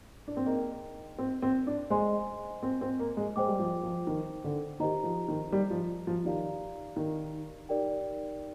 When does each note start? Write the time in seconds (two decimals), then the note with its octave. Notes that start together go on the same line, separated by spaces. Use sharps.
0.28 D4
0.37 C4
0.45 A#3 D#4 G#4 D#5 G5
1.19 C4
1.42 C4
1.67 D4
1.90 G#3 C5 D#5 G#5 C6
2.63 C4
2.81 C4
2.99 A#3
3.17 G#3
3.36 G#3 C5 G5 D6
3.47 G3
3.59 F3
3.83 F3
4.07 D#3
4.44 D3
4.80 D#3 G4 C5 D#5 A#5
5.04 F3
5.28 D#3
5.52 G3
5.70 F3
6.07 F3
6.25 D#3 G4 D5 F5 A#5
6.96 D#3
7.69 D#4 G4 A#4 D5 G5